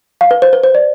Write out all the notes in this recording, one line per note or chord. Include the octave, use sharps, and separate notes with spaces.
F5
B4
C5
B4
C5
D5